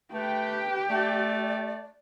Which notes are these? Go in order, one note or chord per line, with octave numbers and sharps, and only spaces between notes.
A3 G4 B4 G5
A3 D5